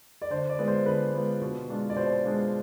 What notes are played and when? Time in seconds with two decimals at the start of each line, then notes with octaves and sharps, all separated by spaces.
0.22 D5
0.30 D3 C5
0.49 D5
0.59 G#3 B3 F4
0.68 C5
0.86 D3 B4
1.14 G#3 B3 F4
1.42 B2
1.69 G#3 D4 F4
1.90 D5
1.96 B2 C5
2.24 G#3 D4 F4